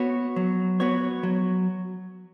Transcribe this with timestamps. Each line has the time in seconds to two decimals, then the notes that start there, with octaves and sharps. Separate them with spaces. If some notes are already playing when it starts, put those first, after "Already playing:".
Already playing: B3 F#4 C#5
0.36 F#3
0.80 B3 F#4 C#5
1.23 F#3